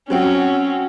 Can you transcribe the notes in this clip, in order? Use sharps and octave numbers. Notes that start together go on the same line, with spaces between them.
F#3 C4 C#4 F#4